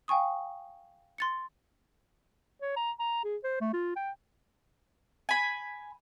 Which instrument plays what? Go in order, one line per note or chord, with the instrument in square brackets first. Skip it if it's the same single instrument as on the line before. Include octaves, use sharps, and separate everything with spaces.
[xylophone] F5 G5 G#5 C#6 D#6
C6 A6 C#7
[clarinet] C#5
A#5
A#5
G#4
C5
A3
F4
G5
[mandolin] G#5 B5